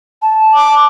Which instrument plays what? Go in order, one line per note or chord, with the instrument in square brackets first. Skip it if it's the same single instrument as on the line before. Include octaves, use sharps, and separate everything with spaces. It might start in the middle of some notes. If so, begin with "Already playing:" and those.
[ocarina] A5
[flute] D6